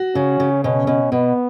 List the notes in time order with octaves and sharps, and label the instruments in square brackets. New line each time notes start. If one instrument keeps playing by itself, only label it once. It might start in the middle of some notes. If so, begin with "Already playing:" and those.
Already playing: [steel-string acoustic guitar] F#4
[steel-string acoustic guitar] C#3 [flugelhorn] C#4
[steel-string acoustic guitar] C#3
[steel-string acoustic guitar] B2 [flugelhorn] C#4
[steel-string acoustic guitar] B2
[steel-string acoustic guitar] B2 [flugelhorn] B3